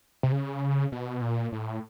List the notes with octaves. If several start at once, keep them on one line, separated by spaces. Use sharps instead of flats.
C3
C#3
B2
A#2
A2